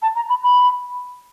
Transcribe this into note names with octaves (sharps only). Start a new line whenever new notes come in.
A5
A#5
B5
B5